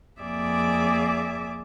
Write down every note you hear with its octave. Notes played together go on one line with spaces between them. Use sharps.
F2 A#3 G#4 D5 E5 D6